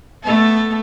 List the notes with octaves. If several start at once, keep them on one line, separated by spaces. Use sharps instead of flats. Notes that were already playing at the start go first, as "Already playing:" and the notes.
A3 B3 A4